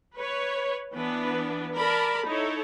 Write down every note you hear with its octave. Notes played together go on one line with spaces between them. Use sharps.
B4 C#5
E3 B3 D4 B4
A#4 D5 A5 B5
D#4 E4 A4 C#5